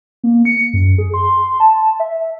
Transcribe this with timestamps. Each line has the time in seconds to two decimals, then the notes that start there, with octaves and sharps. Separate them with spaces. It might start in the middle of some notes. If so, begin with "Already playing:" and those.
0.23 A#3
0.45 C#7
0.73 F#2
0.98 G#4
1.14 C6
1.60 A5
2.00 E5